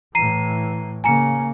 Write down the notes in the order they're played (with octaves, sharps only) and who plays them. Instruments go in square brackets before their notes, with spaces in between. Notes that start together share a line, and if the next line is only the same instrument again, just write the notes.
[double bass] A2 E3 [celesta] A#5 C7 D#7
[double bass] C#3 A#3 [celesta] G#5 A#5 C#7